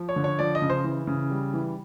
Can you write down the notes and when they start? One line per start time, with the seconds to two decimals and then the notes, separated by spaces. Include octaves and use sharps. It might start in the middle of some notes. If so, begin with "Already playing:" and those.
Already playing: F3
0.09 C#5
0.16 D3
0.24 C#5
0.39 F3 D5
0.55 D#5
0.62 C#3
0.70 C5
0.84 E3
1.07 C#3
1.30 G3
1.54 E3